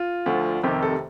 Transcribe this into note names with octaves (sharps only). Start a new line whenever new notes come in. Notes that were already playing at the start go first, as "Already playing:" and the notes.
Already playing: F4
D2 D3 F3
F1 F2 C3 D#3 G4
A4